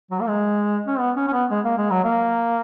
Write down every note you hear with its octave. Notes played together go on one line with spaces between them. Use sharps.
F#3
A#3
G#3
C#4
B3
C#4
C#4
B3
G#3
A#3
G#3
F#3
A#3